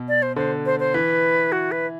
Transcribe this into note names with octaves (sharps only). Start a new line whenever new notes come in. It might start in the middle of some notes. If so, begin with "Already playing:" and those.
Already playing: B2
D5
C5
D3 C5
C5
C5
E3 B4
F#4
B4